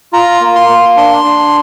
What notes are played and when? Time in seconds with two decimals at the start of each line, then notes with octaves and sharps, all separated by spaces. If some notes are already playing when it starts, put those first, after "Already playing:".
0.13 F4 A#5
0.41 A#3
0.55 C6
0.69 A#3
0.97 D4 C6
1.25 D4